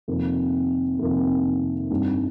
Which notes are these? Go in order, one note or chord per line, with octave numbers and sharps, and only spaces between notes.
F2 C3 D#3 A#3
F2 C3 D#3 A#3
G2 G3 C4 D#4